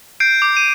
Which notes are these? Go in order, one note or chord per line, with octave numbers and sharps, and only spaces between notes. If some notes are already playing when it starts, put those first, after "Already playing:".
G6 C7 D7
D6
D#7